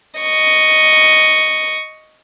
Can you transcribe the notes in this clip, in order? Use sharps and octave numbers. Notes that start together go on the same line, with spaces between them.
D#5 C#6